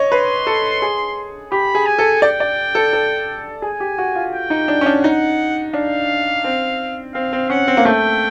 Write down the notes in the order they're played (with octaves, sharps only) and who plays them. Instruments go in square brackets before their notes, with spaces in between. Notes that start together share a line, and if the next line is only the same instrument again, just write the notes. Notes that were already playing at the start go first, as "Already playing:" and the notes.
Already playing: [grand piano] C#5 D#5
[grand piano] B4 [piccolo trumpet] C6
[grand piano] A4
G#4
[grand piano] G4 [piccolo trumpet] B5
[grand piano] G#4
[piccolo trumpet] G#5
[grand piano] A4
[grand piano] D5 [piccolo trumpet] G5
[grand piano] D5
A4
A4
[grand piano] G#4 [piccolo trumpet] G#5
[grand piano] G4
F#4
F4
[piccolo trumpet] G5
[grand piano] D#4
D4
C#4
D4
[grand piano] D#4 [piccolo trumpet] F#5
[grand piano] D4 [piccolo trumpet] F5
[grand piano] C4
[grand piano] C4 [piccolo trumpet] F5
[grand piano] C4
[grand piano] C#4 [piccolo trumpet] F#5
[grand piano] C4
A#3
[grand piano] A3 [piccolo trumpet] G5